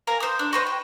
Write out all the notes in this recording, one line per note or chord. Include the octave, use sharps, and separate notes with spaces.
A#4 F5 G#5 A#5
C5 D#6
D4
F#4 B4 C5 D#5
G5